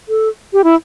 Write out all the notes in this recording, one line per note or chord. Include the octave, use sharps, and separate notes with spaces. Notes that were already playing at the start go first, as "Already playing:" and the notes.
A4
G4
E4